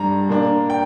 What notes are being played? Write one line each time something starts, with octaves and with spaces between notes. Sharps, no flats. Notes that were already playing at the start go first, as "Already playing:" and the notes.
Already playing: G2 G3 D4 A#5
A#2 A#3 D4
G5